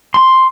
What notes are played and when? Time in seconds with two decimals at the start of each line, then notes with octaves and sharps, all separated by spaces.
0.14 C6